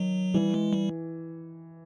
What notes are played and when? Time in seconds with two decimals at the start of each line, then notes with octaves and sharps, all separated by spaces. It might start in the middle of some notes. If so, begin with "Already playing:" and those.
Already playing: D#3 F#3
0.34 E3 G3
0.54 G#3
0.73 G3